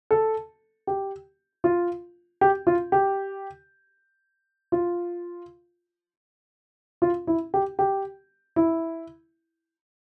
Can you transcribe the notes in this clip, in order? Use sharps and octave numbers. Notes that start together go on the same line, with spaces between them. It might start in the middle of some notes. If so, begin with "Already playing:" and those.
A4
G4
F4
G4
F4
G4
F4
F4
E4
G4
G4
E4